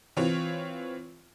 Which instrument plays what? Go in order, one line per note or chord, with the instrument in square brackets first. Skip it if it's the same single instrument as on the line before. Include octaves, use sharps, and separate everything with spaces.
[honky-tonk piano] E3 C4 F4 C#5